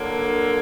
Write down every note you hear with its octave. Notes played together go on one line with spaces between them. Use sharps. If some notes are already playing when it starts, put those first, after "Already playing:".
Already playing: D3 F#3 A#3